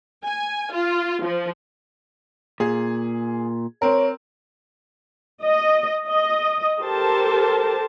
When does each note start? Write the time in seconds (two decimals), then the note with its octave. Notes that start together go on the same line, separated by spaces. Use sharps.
0.24 G#5
0.73 F4
1.22 F3
2.60 A#2 G#4
3.82 C4 A#4 C#5
5.44 D#5
6.06 D#5
6.79 G4 A4 A#4 C5 A5